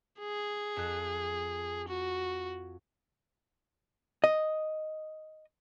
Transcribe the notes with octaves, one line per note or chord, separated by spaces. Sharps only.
G#4
F2 F#6
F#4
D#5